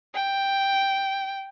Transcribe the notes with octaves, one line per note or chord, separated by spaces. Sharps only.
G5